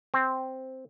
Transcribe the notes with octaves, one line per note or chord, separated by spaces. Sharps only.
C4